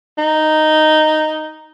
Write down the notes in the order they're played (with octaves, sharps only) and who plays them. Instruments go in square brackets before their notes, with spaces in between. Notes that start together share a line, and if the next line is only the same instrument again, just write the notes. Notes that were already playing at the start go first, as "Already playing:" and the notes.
[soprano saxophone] D#4